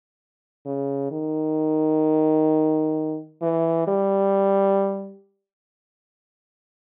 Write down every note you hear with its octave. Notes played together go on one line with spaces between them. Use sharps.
C#3
D#3
E3
G3